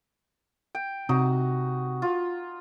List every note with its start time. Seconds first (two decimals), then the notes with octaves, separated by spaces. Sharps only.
0.75 G5
1.09 C3 D#4 F#4
2.02 F4